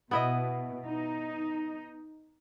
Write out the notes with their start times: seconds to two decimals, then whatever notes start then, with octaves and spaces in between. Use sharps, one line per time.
0.11 B2 B3 E4 D#5
0.86 D#4